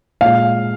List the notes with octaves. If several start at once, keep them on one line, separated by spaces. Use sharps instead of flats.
A#2 G#3 F5